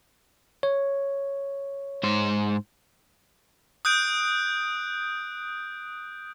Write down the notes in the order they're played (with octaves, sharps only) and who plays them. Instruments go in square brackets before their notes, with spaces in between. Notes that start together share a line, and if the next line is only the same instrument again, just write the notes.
[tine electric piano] C#5
[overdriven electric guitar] G#2 C5
[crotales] D#6 F#6 G6 D7